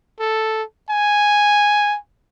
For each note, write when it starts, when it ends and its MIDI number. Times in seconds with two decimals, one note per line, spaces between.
0.20 0.63 69
0.90 1.97 80